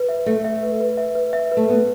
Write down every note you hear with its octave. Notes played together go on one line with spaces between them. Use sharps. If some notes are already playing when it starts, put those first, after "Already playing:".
Already playing: B4
E5
A3 E5
E5
B4
B4
E5
B4
E5
B4
A3
B3 B4